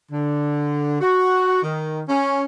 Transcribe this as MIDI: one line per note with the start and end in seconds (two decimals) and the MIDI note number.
0.12 1.00 50
1.01 1.60 66
1.63 2.01 51
2.09 2.43 61